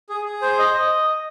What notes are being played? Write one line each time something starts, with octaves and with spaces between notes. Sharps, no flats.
G#4
G#4
C5
D#5
D#5